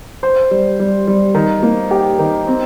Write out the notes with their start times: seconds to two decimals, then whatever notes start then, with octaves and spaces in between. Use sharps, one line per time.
0.23 C5
0.51 G3
0.79 G3
1.07 G3
1.35 D#3
1.63 A#3
1.91 G4
2.19 D#3
2.47 C4